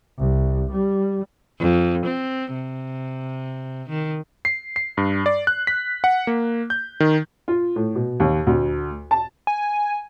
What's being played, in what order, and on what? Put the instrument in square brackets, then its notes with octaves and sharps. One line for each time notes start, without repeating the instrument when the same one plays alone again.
[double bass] C2
G3
[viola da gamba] F2
C4
C3
D#3
[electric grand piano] C7
C7
G2
D5
F#6
B6
F#5
A#3
G6
D#3
[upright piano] F4
A2
B2
D#2
D2
A5
[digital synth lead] G#5